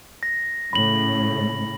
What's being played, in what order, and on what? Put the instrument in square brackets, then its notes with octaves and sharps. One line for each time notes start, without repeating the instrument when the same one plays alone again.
[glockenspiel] A#6
[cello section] A2 C#3 [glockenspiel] B5 F#7